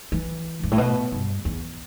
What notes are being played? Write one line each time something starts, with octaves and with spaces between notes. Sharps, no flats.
E3
G2
A2
B2
G2
E2